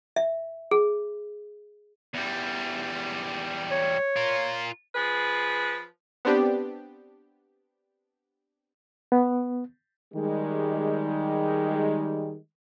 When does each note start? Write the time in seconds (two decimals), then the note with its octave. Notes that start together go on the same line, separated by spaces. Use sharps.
0.16 E5
0.71 G#4
2.15 E2 G3
3.71 C#5
4.16 F4 A#4
4.94 F3 G#4 B4
6.25 B3 C4 D4 G4
9.12 B3
10.14 D#3 G3 G#3